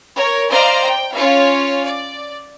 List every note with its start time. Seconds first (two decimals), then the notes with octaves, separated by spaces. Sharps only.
0.15 A#4 C#5
0.49 C5 D5 D#5 F5 A#5 C6
0.86 G5
1.15 C#4 F4 C#5 F5
1.84 D5